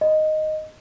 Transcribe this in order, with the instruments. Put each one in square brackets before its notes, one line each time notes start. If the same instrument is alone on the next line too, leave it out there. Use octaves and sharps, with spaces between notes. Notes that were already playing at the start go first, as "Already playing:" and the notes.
[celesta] D#5